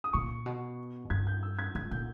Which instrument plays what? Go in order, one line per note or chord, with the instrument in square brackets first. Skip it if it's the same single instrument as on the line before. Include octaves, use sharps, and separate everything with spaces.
[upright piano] D#6
[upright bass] A#2 [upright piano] C#6
[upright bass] B2
[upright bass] G2 [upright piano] G#6
[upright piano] G6
E6
G#6
[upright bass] G#2 [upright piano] G#6
[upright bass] A#2 [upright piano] G6